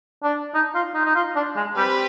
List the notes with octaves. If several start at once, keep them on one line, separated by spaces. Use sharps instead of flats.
D4
D#4
F4
D#4
D#4
F4
D4
G#3
G3 C4 G4 B4